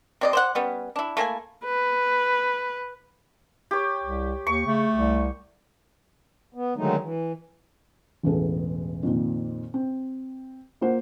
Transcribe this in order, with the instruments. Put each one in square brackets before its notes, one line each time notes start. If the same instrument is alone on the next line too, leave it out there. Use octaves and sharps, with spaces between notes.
[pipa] C3 D5 D#5
C5 D5 F#5
G3 B3 C#4
D4 E4
A3 A#3 E4 G#5
[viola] B4
[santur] G4 C#5
[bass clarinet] C2
[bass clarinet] D#2 [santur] C#6
[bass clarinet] C#3 [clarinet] A3
[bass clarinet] C2
[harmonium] B3
D3 D#3 F#3 G#3 A3 D#4
E3
[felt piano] E1 A1 B3 G#4 A4
F2 A#2 D#3
C4
A#3 F4 C5 F#5